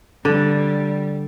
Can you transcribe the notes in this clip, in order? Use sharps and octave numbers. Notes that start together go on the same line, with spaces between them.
D3 G3